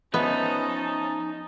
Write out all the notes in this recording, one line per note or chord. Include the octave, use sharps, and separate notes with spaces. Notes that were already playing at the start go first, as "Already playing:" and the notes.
F3 B3 C#4 D#4 C5 E5 A5